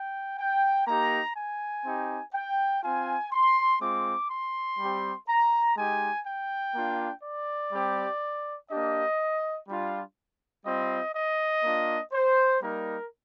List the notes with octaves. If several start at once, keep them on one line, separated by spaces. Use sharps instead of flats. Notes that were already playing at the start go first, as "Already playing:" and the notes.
Already playing: G5
G5
A#3 D#4 G4 A#5
G#5
C4 D#4 G4
G5
C4 F4 G#5
C6
G#3 C4 F4 D6
C6
G3 C4 G4
A#5
G#3 D#4 G4 G#5
G5
A#3 D4 F4
D5
G3 C4 G4
A#3 D4 G4 D#5
G3 D4 F4
G3 C4 F4 D#5
D#5
A#3 D4 F4
C5
G3 A#3 D#4 A#4